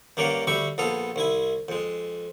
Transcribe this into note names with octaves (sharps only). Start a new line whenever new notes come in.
G2 A#3 C#4 D5 F5 F#5
D2 G3 G4 E5 B5 C#6
A#1 B3 A4 F5 D#6
C2 E4 G#5
F2 G#3